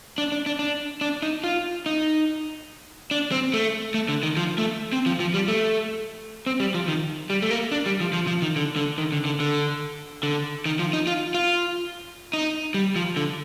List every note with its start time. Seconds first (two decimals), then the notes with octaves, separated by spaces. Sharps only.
0.18 D4
0.32 D4
0.46 D4
0.59 D4
1.01 D4
1.22 D#4
1.44 F4
1.86 D#4
3.11 D4
3.32 C4
3.54 A3
3.94 A3
4.09 D3
4.23 D#3
4.37 F3
4.58 A3
4.93 C4
5.06 F3
5.20 F3
5.34 G3
5.48 A3
6.46 C4
6.60 G3
6.74 F3
6.88 D#3
7.30 G3
7.42 A3
7.51 A#3
7.72 D4
7.86 G3
8.01 F3
8.13 F3
8.27 F3
8.42 D#3
8.56 D3
8.76 D3
8.98 D#3
9.12 D3
9.25 D3
9.40 D3
10.23 D3
10.66 D#3
10.79 F3
10.93 D#4
11.07 F4
11.34 F4
12.33 D#4
12.74 G3
12.96 F3
13.16 D3